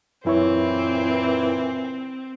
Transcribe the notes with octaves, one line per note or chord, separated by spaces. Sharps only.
F#2 A#2 E3 C4 E4 C#5